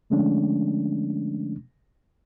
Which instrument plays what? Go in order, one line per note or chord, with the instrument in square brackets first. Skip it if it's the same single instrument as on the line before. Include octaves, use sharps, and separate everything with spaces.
[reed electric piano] D3 F3 G#3 A3 C#4 D4